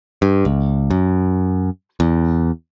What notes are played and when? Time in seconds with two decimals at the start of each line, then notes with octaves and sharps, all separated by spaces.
0.22 G2
0.45 C#2
0.90 F#2
2.00 E2